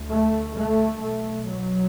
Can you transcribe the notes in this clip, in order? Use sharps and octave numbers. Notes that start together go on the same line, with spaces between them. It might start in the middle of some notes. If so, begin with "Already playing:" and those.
Already playing: D2
A3
A3
B1 B2 A3
F#3